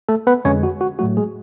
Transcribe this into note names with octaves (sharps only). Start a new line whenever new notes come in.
A3 A4
B3 B4
F2 D3 G#3 C#4 C#5
F#4
F#4
A2 F#3 A3 F#4
G#3 G#4